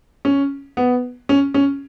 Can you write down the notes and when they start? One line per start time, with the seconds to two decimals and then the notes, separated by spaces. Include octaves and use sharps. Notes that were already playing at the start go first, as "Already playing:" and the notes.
0.25 C#4
0.77 B3
1.29 C#4
1.54 C#4